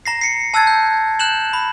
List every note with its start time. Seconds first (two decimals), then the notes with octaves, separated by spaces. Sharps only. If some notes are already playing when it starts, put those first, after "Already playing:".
0.06 A#5 A#6 C7
0.21 C7 C#7
0.54 A5 E6 F#6 G#6 A6
0.67 G6
1.19 F#6 G6 E7 F#7
1.53 B5